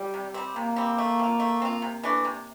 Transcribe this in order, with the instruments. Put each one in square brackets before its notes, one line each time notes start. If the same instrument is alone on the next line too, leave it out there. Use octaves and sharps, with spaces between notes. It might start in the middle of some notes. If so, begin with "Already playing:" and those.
Already playing: [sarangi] G3
[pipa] C3
G3 C4
[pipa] C3 [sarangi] A#3
[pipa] G3 C4
A3
C4 F4
A3
C4 F4
C3
E3 A3 D4
C3